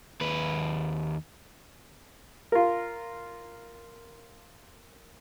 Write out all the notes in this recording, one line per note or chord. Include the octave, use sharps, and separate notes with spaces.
D#2 B4
F4 A#4